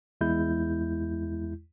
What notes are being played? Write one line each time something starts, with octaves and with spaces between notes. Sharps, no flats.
E2 G#3 E4 G6